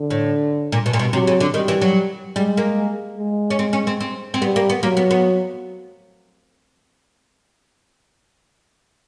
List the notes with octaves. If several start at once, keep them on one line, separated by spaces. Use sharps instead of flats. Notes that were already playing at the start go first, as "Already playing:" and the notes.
Already playing: D3
A2
A#2
B2
A#2
B2
C3 F#3
C#3
D3
D#3 G3
E3
F#3
G3 G#3
A#3
G#3
C#4
C4
C#4
C4
C4
C4
G3 B3
A#3
B3
F#3 A#3
B3
B3